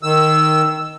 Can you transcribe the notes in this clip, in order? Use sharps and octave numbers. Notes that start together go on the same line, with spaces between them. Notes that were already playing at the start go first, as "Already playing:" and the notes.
D#3 E6